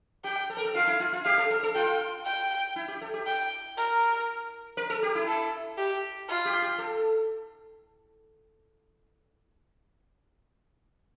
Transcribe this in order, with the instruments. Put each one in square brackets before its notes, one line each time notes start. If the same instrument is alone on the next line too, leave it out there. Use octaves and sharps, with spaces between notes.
[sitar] G4 [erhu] G5
[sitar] A4
A#4
A4
[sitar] F4 [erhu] F5
[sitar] E4
F4
F4
[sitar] G4 [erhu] F5
[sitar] A4
A4
A4
[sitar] F4 [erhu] G5
[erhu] G5
[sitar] E4
G4
A4
G4
[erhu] G5
A#4
[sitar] A#4
A4
G4
E4
[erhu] A4
G4
F4
[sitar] G4
G4
A4